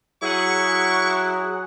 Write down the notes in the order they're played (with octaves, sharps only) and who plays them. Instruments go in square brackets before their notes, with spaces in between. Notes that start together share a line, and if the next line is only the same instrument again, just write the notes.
[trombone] F#3 [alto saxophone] E4 [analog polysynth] G#4 F#5 [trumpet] C#6